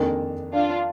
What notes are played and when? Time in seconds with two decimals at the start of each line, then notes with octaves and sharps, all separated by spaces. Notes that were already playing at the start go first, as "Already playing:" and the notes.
Already playing: F2 D#3 A#3 D4 G#4
0.53 D4 F4